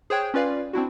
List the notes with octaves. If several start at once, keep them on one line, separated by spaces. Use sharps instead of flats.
G#4 C5 C#5 G5 F#6 G#6
C#4 F4 B4 D5 F5
C4 D4 E4 F#4